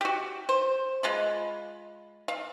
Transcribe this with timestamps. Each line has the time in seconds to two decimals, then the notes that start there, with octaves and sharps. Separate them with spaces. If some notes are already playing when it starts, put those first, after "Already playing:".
0.01 F#4 G4
0.49 C5
1.03 G#3 F4 B5
2.28 F5